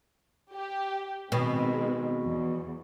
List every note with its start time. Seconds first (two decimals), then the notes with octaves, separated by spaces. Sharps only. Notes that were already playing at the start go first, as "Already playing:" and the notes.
0.53 G4
1.32 B2 D#3 G#3 C4
2.22 E2